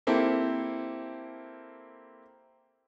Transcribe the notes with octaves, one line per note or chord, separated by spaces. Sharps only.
A#3 C4 E4 G4 A4